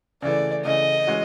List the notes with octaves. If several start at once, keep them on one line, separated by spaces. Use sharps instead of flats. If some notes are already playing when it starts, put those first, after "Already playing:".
C#3 E3 A3 D5
C#3 E3 A3 D#5
E3 G#3 C#4 F#4